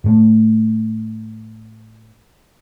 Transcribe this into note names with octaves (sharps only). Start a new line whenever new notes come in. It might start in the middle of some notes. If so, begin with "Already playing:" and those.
A2 A3